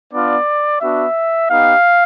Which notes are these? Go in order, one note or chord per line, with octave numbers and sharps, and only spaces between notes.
B3 D4 F4 D5
B3 D4 F#4 E5
B3 D#4 G4 F5